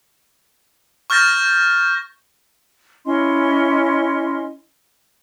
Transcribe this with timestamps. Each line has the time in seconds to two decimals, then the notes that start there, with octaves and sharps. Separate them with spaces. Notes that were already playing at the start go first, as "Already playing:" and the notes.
1.10 C#6 F6 G6 A6 A#6
3.05 C#4 E4 D#5 C6